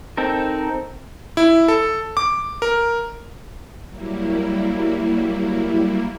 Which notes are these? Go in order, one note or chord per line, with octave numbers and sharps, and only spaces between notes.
C4 D#4 A4 A#4
E4
A4
D6
A#4
F#3 G3 A#3 E4